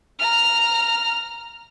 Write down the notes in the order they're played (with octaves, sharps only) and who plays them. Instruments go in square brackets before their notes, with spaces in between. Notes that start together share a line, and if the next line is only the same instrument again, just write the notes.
[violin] A#5 F6